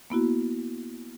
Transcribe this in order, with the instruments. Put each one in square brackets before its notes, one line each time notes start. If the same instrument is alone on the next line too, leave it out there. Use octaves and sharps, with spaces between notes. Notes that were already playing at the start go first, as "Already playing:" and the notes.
[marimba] A#3 B3 E4 F#4